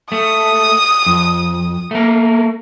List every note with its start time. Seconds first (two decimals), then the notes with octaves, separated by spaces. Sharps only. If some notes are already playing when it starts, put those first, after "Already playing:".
0.12 A3 D#6
1.06 F2
1.91 A3 A#3